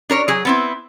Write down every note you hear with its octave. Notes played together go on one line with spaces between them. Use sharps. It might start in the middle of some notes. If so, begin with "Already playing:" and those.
D4 A#4 C#5
F#3 G#4
B3 C4 E4